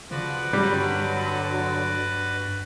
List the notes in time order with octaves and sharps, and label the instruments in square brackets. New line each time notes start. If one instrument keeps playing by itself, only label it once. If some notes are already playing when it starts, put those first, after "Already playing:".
[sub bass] C#3 [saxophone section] F3 [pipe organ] F#4 B4 D5
[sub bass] G2 [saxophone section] D3 F#3 [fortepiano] G3